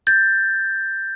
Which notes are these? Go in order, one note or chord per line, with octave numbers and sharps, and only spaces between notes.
G6 A6